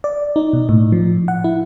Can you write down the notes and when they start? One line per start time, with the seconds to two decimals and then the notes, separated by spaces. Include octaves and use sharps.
0.04 D5
0.36 D#4
0.53 B2
0.69 A2
0.92 F3
1.28 F#5
1.44 E4